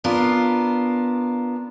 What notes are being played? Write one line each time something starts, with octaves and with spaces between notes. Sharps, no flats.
B3 D4 F4 A#4